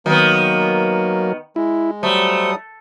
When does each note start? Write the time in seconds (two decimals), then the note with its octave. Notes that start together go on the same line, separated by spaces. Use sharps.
0.06 D#3 F#3 A#3 B3 A#4
1.56 G#3 E4
2.03 F#3 G3 A3 C5 D#6